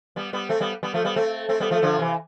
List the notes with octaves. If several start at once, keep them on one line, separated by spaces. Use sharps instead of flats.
G3 B3
G3 B3
A3 C4
G3 B3
G3 B3
F3 A3
G3 B3
A3 C4
A3 C4
G3 B3
F3 A3
D3 F3
C3 E3